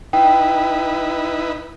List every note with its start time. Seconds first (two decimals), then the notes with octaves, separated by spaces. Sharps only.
0.13 D#4 E4 B4 G5